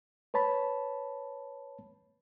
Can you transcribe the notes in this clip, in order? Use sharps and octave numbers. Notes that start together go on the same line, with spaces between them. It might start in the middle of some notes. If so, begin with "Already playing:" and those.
B4 C#5 A5 B5